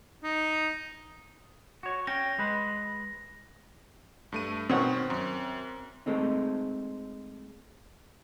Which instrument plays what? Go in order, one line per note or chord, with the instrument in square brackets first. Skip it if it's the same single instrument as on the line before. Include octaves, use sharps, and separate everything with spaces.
[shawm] D#4
[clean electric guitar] F#4 C#5
[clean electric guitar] C#4 G5 [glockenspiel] A#6
[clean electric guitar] G#3 B4
[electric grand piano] G2 A3 D#7
[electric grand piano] B2 D#3 [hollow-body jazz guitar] C4 C#5 F#5
[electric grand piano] F#2
[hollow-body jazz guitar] G#3 A3 C4 D#4